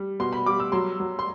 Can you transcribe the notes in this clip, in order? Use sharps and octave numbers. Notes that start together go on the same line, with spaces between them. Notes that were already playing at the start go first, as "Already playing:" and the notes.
Already playing: G3
B2 C6
B5
G3 D6
E6
F#3 C6
F#3
C6